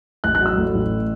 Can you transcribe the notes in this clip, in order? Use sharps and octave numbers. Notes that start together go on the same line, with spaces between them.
A1 F#6
F#6
F#3 E6
A2
A1